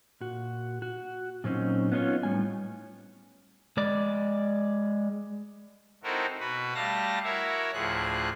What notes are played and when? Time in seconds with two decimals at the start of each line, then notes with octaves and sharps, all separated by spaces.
0.21 A#2 F#4
0.82 F#4
1.44 A#2 F#3 C4 C#4 D#4
1.92 B3 C#4 D#4 F4 C#5
2.23 A2 G3 G#5
3.77 G#3 D5
6.03 C4 D#4 E4 F#4 A4 A#4
6.40 B2 F#4 B4
6.75 G3 A3 F5 A5 A#6
7.24 E4 F#4 A#4 C#5 E5
7.73 D2 A2 F3 G#4 F#6